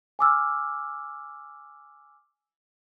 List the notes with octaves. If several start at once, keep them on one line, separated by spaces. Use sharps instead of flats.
G#5 D6 E6 F6